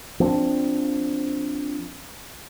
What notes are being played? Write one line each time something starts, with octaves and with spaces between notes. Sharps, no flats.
F3 C4 D4